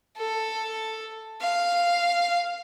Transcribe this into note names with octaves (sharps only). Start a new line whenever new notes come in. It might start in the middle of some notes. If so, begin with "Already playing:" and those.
A4
F5